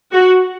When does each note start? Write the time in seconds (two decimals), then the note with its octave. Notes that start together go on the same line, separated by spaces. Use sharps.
0.12 F#4